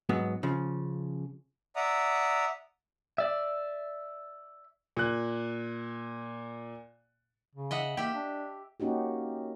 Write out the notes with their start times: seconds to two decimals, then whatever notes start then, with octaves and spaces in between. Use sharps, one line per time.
0.09 G#2 F#3 B3
0.43 C#3 F3
1.76 D5 E5 F#5 A#5 D#6
3.18 D5 E5
4.97 A#2 F#6
7.55 C#3
7.71 D#5 E5 F#5
7.97 A#3 G4 E5
8.14 D4
8.80 A#3 C#4 D#4 F#4 G4